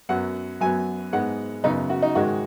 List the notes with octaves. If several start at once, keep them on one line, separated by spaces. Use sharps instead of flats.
F#2 F#3 B3 F#5
F#2 F#3 B3 G#5
G#2 G#3 B3 F#5
F#2 C#3 B3 D#4
F#4
D#4
G#2 D#3 G#3 F#4